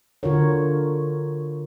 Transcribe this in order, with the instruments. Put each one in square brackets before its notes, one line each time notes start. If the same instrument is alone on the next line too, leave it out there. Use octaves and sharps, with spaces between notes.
[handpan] D3 F4 F#4 A#4 C#5